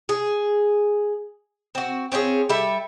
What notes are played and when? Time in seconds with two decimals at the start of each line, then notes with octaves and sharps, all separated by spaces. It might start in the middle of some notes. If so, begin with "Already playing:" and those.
0.09 G#4
1.75 C4 F#4
2.12 C4 C#4 F4 G#4
2.49 G3 A4 E5